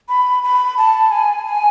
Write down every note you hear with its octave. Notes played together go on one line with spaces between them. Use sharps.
B5
B5
A5
G#5
G#5